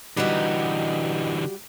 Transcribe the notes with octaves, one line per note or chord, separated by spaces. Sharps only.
D3 E3 G3 B3 D#4 F#4 G4